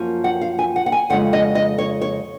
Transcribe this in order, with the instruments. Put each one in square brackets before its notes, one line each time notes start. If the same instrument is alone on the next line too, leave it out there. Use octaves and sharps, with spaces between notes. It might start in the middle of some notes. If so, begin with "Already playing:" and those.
Already playing: [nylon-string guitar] F#2 F3 A#3 C#4
F#5
F5
G#5
F#5
F#5
G#5
F2 C#3 G#3 C#4 F#5
D#5
D#5
C#5
C#5